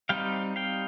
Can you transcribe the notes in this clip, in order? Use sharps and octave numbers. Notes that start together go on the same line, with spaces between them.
G3 C4 D#4 F5 G5
F5 G5